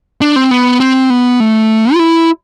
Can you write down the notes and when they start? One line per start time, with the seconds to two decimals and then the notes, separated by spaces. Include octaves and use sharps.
0.21 D4
0.36 C4
0.51 B3
0.80 C4
1.10 B3
1.40 A3
1.94 F4
1.99 E4